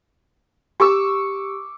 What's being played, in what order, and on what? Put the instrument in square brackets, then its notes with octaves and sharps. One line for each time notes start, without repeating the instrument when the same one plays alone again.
[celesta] G4 [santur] C#6 D6 E6